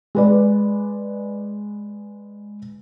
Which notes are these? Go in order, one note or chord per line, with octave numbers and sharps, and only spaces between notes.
G#3 B4 D5